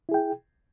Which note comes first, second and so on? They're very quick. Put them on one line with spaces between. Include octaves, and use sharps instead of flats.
E4 G#4 G5